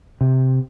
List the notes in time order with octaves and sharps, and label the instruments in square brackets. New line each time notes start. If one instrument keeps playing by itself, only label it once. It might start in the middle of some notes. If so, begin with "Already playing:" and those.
[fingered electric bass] C3